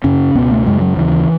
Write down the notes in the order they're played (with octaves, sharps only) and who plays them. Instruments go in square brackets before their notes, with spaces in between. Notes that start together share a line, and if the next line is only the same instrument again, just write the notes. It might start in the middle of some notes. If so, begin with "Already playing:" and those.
[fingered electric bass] F#2 C#3 C#4
C#2 B2 B3
A3
F#2 C#3 G#3
F#3
D#2 C#3 E3